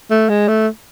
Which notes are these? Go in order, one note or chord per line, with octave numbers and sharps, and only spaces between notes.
A3
G#3
A3